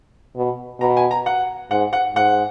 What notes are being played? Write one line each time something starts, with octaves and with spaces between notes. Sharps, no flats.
B2
B2 A#5
G#5
A#5
F#5
G#2 F#5
F#5
G#2 F#5